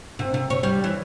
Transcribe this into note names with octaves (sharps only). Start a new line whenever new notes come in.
C3
C3
C#5
G3
E3